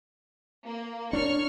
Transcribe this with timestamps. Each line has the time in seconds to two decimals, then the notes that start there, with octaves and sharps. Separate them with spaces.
0.64 A#3
1.13 D4 C#5 C#6 F6